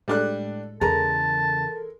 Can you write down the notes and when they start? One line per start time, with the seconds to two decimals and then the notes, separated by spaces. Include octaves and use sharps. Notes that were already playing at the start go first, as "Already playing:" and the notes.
0.08 A2 G3 G#3 D4 A4 F#6
0.81 E2 C#3 E3 G#3 A4 A#4 A5 A#5